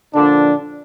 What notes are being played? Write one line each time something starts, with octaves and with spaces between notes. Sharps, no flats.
A#2 D3 F3 D4